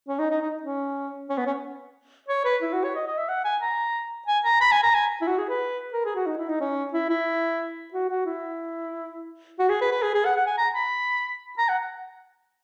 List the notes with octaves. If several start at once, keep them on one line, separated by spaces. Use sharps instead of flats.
C#4
D#4
D#4
D#4
C#4
C#4
B3
C#4
C#5
B4
E4
F#4
C#5
D#5
D#5
E5
F#5
G#5
A#5
G#5
A#5
B5
G#5
A#5
G#5
E4
F#4
G#4
B4
A#4
G#4
F#4
D#4
E4
D#4
C#4
E4
E4
F#4
F#4
E4
F#4
G#4
B4
B4
G#4
G#4
F#5
F#5
G#5
A#5
B5
A#5
F#5